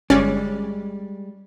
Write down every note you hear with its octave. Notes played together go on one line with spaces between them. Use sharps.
G1 G3 G#3 C#4 D5